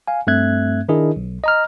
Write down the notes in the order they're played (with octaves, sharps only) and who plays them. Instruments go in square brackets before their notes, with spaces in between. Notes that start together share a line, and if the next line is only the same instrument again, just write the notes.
[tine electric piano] F5 G#5
G2 A3 C4 E5 F#6 G#6
D#3 D4 E4 G#4 A#4 D#5
B1
D#5 A#5 F6